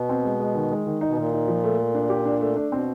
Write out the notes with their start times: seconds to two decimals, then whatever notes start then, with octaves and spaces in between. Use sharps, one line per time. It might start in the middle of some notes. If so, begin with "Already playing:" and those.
Already playing: B2
0.09 C4
0.24 G#3
0.39 G#3
0.55 D#3
0.71 G#3
0.87 D#3
1.01 D#4
1.08 B2
1.17 A#2 D#3
1.33 D#4
1.48 F3
1.64 A3
1.79 A3
1.95 D4
2.10 G4
2.25 D4
2.41 A3
2.56 D4
2.72 B2 C4